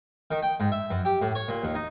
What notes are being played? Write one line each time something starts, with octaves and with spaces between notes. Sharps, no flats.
D#3
G5
G#2
E5
F#2
G4
A2
C#5
A#2
D#2
D#4